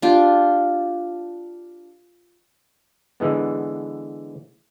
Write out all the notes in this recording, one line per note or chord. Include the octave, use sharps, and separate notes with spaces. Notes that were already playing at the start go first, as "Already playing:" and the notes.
D4 F4 G4
D3 E3 G#3 B3